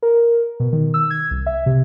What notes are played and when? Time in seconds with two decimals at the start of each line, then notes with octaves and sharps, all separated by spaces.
0.03 A#4
0.60 B2
0.73 D#3
0.94 E6
1.10 G#6
1.31 C2
1.46 E5
1.66 C3